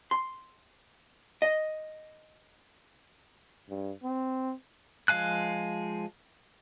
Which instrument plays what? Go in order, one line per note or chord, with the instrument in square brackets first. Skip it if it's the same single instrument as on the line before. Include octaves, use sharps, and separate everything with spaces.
[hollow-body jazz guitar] C6
D#5
[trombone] G2
C4
[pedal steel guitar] F3 G#3 F5 G#5 F#6